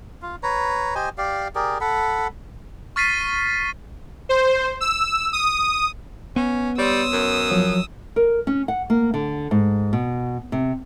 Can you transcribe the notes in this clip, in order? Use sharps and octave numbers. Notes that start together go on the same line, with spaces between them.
F4
B4 C#5 A#5
G4 C5 D#5 G#5
G4 D5 F5
G4 G#4 A#4 D5
A4 F#5 B5
C#6 F6 A6 B6 C7 D#7
C5
E6
D#6
B3 C#4
G3 C#5 C6 D#6 E6
F#2
F3 F#3 C#5
A#4
C#4
F#5
A#3
D3
G#2
B2
C3